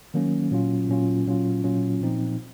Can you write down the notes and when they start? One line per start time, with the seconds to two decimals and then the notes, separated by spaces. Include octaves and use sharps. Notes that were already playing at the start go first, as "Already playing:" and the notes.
0.14 D#3 F#3 A#3 C#4
0.51 A#2 F#3 C#4 F4
0.89 A#2 F#3 C#4 F4
1.27 A#2 F#3 C#4 F4
1.64 A#2 F#3 C#4 F4
2.01 A#2 F3 C4 D#4